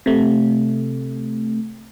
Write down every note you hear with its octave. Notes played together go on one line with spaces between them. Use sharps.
C3 A3